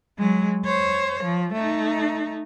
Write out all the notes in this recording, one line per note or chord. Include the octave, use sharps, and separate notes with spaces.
F#3 G#3
C5 C#5
F3
A3 D#4